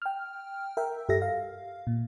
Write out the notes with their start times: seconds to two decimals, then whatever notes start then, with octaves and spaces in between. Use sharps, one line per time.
0.02 G5 F6
0.77 A#4 E5 G5
1.09 G2 G4 A4 E5 A#6
1.22 F5
1.87 A#2